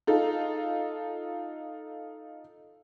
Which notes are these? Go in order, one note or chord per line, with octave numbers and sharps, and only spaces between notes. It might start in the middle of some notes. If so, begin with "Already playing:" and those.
D#4 F4 A4